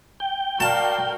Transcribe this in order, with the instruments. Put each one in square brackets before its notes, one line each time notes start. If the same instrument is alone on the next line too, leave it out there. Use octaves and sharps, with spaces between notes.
[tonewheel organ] G5
[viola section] F#4 A#4 [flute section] D5 F5 [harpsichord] A5